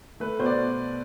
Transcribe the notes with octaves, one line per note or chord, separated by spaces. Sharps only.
A3 B4
B2 C5
D5
B2